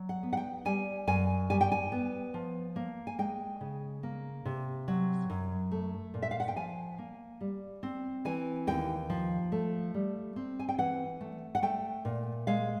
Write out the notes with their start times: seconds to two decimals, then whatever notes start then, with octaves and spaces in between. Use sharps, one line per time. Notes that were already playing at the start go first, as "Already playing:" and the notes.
Already playing: F#3
0.09 F#5
0.23 B3
0.33 F#5
0.37 G5
0.65 G3 G#5
1.07 F#2 G#5
1.50 G3 G#5
1.61 G5
1.72 G#5
1.92 B3
2.34 F3
2.76 A#3
3.07 G#5
3.18 G#3 G5
3.61 C#3
4.03 A#3
4.45 C3
4.88 F#3
5.30 F#2
5.71 A3
6.14 A#2
6.22 E5
6.31 F5
6.40 F#5
6.48 G5
6.56 F3 G#5
6.99 A#3
7.41 G3
7.83 C4
8.25 E3 G#5
8.67 D#2 G5
9.10 F3
9.52 A3
9.94 G3
10.36 C4
10.59 G#5
10.69 G5
10.78 E3 F#5
11.21 A3
11.55 F#5
11.62 A3 G5
12.05 A#2
12.47 G#3 F5